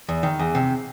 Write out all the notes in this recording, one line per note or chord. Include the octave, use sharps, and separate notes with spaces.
E2
D#3
E2
C3